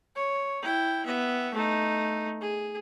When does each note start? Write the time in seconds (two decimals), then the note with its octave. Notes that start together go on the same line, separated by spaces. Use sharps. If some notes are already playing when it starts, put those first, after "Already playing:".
0.16 C#5
0.62 E4 G5
1.06 B3 E5
1.54 A3 D#4
2.41 G#4